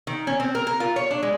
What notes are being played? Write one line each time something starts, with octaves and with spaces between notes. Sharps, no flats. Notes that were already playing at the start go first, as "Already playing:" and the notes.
D#3
C#4
C4
A#4
A#4
F4
C#5
D4
G#3